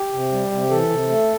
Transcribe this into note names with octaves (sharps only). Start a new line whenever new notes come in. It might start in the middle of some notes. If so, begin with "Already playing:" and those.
Already playing: G4
C3
G3
C3
E3 A4
C3
A3